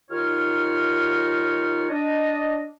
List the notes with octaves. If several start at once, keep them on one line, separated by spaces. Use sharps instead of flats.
D#2 D#4 F4 C#5 F6
D4 D#5